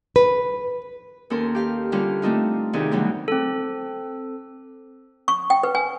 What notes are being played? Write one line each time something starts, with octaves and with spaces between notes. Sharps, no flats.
B4
D#2 C#4 A4 A#4 C6
G4 F5
D3 G3 C#4 F4 F5
A3 C4 D4 D#4 F4
D2 C3 D#3 D#4 G#4 D5
B2 D3 F#3 G3
C4 A4
C#6
G5
B4
G#5